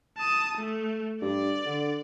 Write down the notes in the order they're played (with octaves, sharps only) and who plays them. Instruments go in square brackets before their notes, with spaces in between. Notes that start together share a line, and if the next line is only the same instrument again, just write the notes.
[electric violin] A5 D#6
A3
[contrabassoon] G2 [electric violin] D5
[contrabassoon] D3